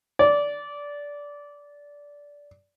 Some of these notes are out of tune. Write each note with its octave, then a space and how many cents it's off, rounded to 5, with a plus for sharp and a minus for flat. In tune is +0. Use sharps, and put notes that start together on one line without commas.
D5 -15